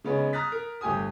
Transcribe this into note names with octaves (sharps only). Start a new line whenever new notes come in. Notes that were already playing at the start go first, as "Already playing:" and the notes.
C#3 G#3 B3 C#4 D#4 C#5
A#5 D#6 F6 F#6 A6 B6
A#4
G1 A3 G4 G#5 D#6